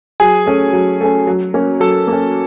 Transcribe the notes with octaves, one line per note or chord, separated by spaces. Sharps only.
F#3 G#4 G#5
A3 C#4
F#3
A3 C#4
F#3
A#3 C#4
F#3 A4 A5
A#3
C#4